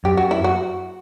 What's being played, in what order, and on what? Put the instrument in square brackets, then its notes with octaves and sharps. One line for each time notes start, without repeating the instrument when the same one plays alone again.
[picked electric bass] F#2 [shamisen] G4
[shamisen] F#4
E4
F#4